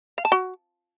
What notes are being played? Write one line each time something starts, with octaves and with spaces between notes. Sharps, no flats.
F5
A5
F#4